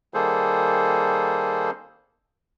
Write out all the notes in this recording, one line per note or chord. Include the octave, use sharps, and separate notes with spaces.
D#3 G3 A#3 G#4 A4 C5